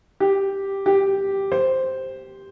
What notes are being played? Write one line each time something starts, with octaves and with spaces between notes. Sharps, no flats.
G4
G4
C5